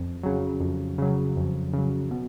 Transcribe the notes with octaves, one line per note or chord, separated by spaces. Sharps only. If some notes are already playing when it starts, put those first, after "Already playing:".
Already playing: F2
C#3 F#3
F2
C#3 F#3
F2
C#3 F#3
B2